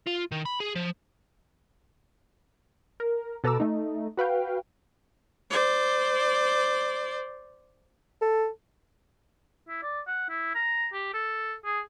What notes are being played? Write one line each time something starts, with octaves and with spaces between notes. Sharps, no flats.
F4
D#3
B5
G#4
F3
A#4
B2 A4 B4 A#5 D6 E6
A3 D#4
F#4 B4 F5 G5
C5 D5
A4
E4
D5
F#5
E4
A#5
G4
A4
G#4